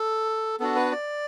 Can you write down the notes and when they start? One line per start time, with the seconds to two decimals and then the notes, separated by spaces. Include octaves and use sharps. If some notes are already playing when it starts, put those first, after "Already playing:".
Already playing: A4
0.60 B3 D4 F#4 A4
0.76 B4
0.92 D5